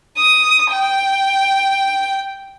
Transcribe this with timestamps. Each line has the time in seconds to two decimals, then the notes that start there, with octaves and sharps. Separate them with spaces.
0.18 D#6
0.72 G5